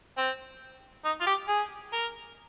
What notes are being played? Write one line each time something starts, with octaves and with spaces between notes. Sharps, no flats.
C4
D#4
F4
G4
G#4
A#4